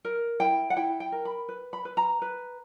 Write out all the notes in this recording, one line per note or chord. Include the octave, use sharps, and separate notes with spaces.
A#4
E4 G5
F#5
E4 G5
G5
A#4
B5
B4
B5
B4
A#5
B4